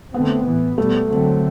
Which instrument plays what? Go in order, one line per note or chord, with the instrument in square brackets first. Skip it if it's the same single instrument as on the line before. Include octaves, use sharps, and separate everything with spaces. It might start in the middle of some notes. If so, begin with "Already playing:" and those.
[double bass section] D3 A3 C4 [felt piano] B3
[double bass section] A2 E3 B3
[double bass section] B2 G3 B3 [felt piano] A3
[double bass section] D3 F#3 A3 C4